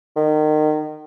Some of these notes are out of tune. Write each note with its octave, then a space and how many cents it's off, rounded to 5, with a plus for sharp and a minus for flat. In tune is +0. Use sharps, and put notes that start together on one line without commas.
D#3 -30